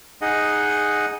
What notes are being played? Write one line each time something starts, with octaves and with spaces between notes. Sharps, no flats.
D#4 G#4 D#5 F#5